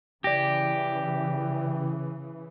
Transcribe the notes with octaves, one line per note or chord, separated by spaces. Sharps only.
C#3 E3 G4 D5 A#6